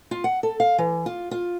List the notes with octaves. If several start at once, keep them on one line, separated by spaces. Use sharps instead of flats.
F4
F#5
A4
F5
E3
F4
F4